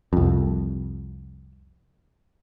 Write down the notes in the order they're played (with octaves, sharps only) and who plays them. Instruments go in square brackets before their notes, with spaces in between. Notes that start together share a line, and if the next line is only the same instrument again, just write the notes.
[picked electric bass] C2 F2